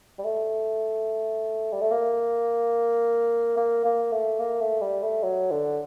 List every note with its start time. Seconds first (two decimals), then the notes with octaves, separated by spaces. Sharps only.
0.19 G3
0.24 A3
1.72 G3
1.82 A3
1.91 A#3
3.57 A#3
3.85 A#3
4.12 A3
4.40 A#3
4.60 A3
4.82 G3
5.03 A3
5.23 F#3
5.51 D3